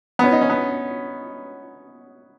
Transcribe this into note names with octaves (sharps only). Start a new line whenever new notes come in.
B3
C#4
D#4
C#4
B3